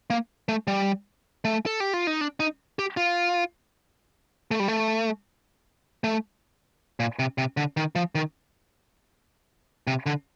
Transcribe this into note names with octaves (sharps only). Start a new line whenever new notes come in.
A#3
A3
G3
A3
A4
G4
F4
D#4
D4
D#4
G4
F4
A3
G3
A3
A3
A#2
C3
C3
D3
D#3
F3
D#3
C3
D3